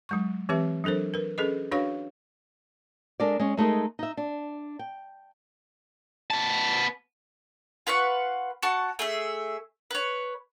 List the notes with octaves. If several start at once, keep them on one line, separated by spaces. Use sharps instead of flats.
F#3 G#3 C#6
E3 C4 G4 B4 E5
F#3 D4 A4 A#4 C5
A#4 B4
C#4 G#4 A4 B4 D#5
D4 F#4 B4 C#5 F5 C#6
G#3 D4 A4 A#4 D5
G#3 C#4
G#3 A3 D#4 G#4 A#4
D#4 E5
D4
G5
B3 A5
F4 B4 F#5 C#6
F#4 A5 C#6
A3 G#4 E5
B4 C#5